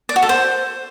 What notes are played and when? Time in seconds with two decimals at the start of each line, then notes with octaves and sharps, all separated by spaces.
0.09 D5
0.16 F#4
0.22 A4
0.29 C5